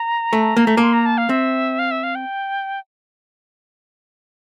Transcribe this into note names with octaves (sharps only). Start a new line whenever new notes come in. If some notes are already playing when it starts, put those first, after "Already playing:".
Already playing: A#5
A3
A#3
A3
A#3 C6
A#5
A5
F5
C4 E5
F5
E5
F5
G5